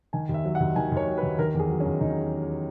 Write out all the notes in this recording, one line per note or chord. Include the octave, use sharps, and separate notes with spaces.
D#3 G#5
D#2
E5
F#3
F#5
D#2
D#3 G#5
D#2 C#5
F#3
B4
D#2
D#3 A#4
E2 G#4
F#3
C#4
E2
D#3 D#4